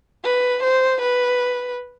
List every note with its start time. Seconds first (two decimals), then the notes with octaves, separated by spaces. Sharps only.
0.25 B4
0.63 C5
1.02 B4